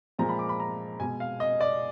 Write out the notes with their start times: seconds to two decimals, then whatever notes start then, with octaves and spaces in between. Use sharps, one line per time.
0.19 A#2 F3 G#3 A#5
0.29 B5
0.39 D6
0.49 B5
0.60 A#5
1.00 B2 G#3 G#5
1.20 F5
1.40 D#5
1.61 D5